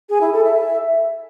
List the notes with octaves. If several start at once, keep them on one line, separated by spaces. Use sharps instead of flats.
G#4
E4
A4
E5